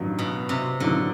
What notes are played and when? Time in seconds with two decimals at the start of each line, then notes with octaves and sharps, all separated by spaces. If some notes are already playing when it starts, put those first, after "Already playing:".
Already playing: A1 G2 D#3 F#3
0.19 B2
0.49 C3
0.80 A1 G2 D3 D#3 F#3